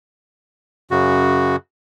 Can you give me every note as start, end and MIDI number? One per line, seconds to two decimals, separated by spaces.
0.91 1.56 42
0.91 1.56 49
0.91 1.56 66